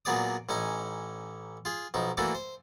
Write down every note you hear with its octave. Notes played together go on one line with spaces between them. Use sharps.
A#2 F#3 B3 G#4 D5 D#6
A1 C#4 D#4 G#5
F4 G#4
B1 F3 D#4
E3 A3 A#3 D4 F#4
C5